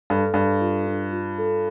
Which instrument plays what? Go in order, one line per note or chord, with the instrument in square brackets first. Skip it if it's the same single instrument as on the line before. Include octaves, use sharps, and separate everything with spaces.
[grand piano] G2 [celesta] A4
[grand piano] G2 [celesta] A4
[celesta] F4
D4
F4
A4